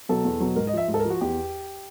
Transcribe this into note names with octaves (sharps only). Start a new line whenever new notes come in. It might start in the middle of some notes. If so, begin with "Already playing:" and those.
B2 F#3 A4
E2
B2 F#3
G#2 A#4
D#5
F3 E5
G#2
A4
A#4
F3
F#4
E2 G4